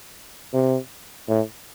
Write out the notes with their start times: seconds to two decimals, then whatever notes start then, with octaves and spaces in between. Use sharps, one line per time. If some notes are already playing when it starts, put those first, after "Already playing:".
0.54 C3
1.29 A2